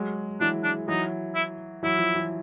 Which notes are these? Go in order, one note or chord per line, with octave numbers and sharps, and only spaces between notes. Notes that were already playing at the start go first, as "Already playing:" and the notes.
Already playing: F#3 G#3
E3 F#3 D4
D4
E3 F#3 D#4
E4
E3 F#3 E4
F3
E3